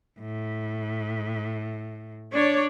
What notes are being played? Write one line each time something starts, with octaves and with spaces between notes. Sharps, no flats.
A2
D4 C#5 D5